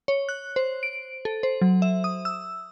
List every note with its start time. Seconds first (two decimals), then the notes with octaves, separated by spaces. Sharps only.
0.08 C#5
0.29 F#6
0.56 C5
0.83 D7
1.25 A4
1.43 C5
1.61 F#3
1.82 E5
2.04 D#6
2.25 E6